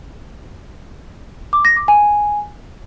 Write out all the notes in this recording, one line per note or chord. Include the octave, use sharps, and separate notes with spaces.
D6
A#6
D6
G#5